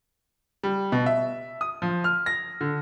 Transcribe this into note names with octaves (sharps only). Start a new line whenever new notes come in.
G3
B2
E5
D#6
F3
F6
A#6
D3